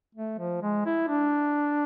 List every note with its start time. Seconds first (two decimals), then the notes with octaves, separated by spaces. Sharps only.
0.15 A3
0.38 F3
0.62 G#3
0.86 E4
1.09 D4